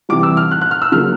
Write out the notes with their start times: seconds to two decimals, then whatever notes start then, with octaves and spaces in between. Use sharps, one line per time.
0.09 C3 E3 G3 D6
0.23 E6
0.37 F6
0.51 F#6
0.61 F#6
0.71 F6
0.82 E6
0.92 C#3 F#3 A#3 F6